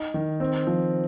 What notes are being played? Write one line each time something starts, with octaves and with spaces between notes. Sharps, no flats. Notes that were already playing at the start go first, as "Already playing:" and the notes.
Already playing: D#4
D#3
C4
F3